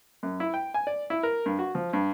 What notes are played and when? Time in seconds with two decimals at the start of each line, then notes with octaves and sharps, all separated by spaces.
0.23 F#2
0.40 E4
0.54 G5
0.74 G#5
0.87 D5
1.10 E4
1.23 A#4
1.46 G2
1.59 F#4
1.75 F3
1.93 G2